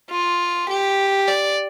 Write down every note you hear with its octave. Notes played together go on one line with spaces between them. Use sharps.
F4
G4
D5